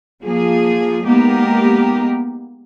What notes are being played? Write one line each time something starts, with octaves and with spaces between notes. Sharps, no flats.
F3 A#3 G#4
G#3 A#3 B3 D#4 G4 A#4